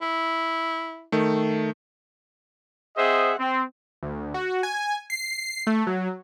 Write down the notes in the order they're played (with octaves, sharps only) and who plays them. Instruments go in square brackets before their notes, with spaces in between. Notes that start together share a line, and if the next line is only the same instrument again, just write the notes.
[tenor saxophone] E4
[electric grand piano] D#3 A3
[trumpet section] C4 G#4 C5 D#5 E5 F#5
C4
[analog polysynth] D2
F#4
G#5
C7
A3
F#3